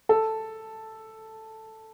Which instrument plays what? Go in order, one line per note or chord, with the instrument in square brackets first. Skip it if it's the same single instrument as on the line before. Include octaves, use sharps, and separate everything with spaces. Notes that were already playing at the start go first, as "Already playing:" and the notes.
[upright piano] A4